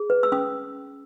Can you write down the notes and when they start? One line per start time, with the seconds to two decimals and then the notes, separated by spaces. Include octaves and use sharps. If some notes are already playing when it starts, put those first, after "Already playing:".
Already playing: G#4
0.10 B4
0.23 E6
0.32 C#4 D#6